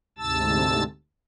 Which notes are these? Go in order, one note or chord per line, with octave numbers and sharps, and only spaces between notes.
D2 G#2 C3 A5 E6 A6